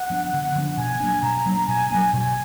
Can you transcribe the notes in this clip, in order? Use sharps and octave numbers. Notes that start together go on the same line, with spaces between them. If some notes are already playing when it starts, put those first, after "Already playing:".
Already playing: F#5
F3 B3 D4
D3
F3 B3 D4
B2 G#5
F#3 A#3 D4
B2 A#5
F#3 A#3 D4
B2 G#5
F#3 A#3 D4
B2 G#5